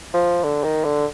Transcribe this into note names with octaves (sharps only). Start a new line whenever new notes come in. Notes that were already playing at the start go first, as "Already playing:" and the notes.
F3
D3
D#3
D3